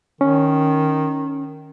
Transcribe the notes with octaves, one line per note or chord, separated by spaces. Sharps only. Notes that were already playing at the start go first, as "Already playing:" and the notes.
D#3 C#4